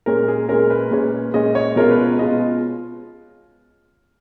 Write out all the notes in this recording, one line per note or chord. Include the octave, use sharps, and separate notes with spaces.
A#2 G#3 C#4 A#4
G#4
A#2 G#3 C#4 A#4
B4
A#2 G#3 C#4
A#2 G#3 C#4 D#5
C#5
B2 G#3 C#4 F4 A#4
B4
B4
B2 G#3 C#4 F4 D#5